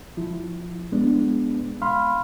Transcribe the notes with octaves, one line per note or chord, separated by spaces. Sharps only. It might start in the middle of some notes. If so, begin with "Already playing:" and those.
F3 E4
G#3 B3 D4
F5 B5 C6 F6